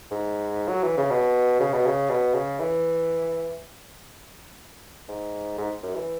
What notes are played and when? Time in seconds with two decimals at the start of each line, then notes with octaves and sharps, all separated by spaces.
0.11 G#2
0.69 F#3
0.83 E3
0.97 C#3
1.11 B2
1.60 C#3
1.73 B2
1.86 C#3
2.10 B2
2.35 C#3
2.60 E3
5.08 G#2
5.58 G#2
5.83 F#2
5.95 E3